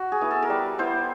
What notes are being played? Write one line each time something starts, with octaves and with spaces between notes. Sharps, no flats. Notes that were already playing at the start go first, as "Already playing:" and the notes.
Already playing: F#4
G#4
B3 E4
A4
A#4
G3 B4
B3 E4 C5